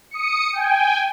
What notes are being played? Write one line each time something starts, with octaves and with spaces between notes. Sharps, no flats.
D#6 C#7
G5 G#5